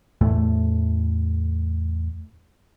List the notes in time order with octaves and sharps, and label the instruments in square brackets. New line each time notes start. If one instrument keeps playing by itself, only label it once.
[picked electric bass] E2 A2 A3